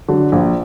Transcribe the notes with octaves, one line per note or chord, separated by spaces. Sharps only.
D3 F#3
A#1